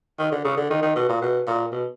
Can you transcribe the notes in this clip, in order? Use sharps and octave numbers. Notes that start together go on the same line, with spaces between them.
D#3
D3
C#3
D3
D#3
D#3
B2
A#2
B2
A#2
B2